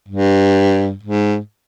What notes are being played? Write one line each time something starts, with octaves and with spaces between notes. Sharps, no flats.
G2
G#2